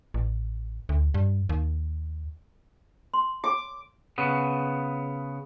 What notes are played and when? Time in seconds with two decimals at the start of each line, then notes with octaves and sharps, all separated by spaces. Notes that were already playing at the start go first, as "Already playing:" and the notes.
0.14 A1
0.89 D2
1.14 G2
1.49 D#2
3.14 C6
3.44 D6
4.18 C#3 B3